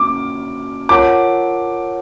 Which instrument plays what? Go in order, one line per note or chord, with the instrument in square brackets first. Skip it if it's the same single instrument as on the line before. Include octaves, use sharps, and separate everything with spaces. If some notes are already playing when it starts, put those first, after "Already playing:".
Already playing: [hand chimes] A#3 C#4 F#4 [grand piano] D6
[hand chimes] F4 A#4 C#5 F#5 A5 [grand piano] D6